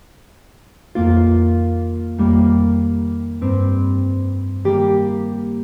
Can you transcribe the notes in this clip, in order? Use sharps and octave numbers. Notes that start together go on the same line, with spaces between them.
F2 D#3 A#3 F4
F2 D#3 G3 A#3
G2 G3 C4
D#3 G3 A#3 G4